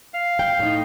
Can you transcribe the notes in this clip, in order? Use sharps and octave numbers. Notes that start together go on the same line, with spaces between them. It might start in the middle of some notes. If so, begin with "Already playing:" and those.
F5
G5
A2 D#4